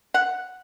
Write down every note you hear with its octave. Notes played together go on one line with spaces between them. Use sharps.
F#5